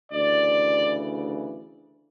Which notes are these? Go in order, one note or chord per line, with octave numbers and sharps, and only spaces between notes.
D2 C#3 E3 D5